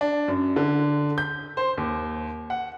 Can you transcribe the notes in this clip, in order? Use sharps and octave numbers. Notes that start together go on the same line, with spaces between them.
D4
F#2
D3
G6
C5
D#2
F#5